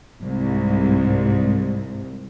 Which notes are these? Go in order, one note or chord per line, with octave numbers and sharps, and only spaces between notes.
C2 G#2